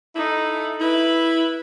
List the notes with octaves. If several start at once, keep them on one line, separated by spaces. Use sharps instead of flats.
D#4 E4 A4
E4 B4